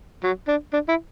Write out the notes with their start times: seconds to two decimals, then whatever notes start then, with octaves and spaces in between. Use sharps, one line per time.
0.23 F#3
0.48 D4
0.73 D4
0.89 E4